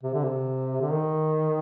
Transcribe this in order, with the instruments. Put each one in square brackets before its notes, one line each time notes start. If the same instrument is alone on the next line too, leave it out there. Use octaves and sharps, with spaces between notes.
[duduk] C3
D3
C3
D3
D#3